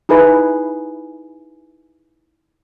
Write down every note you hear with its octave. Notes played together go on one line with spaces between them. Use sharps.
D#4 E4 G#4 B4 B5